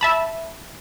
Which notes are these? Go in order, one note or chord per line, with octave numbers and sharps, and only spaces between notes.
E5 A5 B5